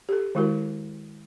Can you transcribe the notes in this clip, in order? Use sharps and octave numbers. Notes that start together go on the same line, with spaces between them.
G4 A4
D#3 G#3 E4 F#4 A#4